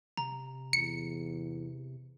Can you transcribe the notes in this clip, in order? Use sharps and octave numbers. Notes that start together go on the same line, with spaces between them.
C3 A#5
E2 C#7